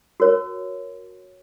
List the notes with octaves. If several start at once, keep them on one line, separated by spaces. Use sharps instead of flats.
F#4 A#4 C#5